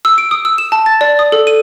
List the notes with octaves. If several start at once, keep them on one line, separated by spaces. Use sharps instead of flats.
E6
D7
D#6
E6
E7
A5
A6
D5
D#6
A4
D#7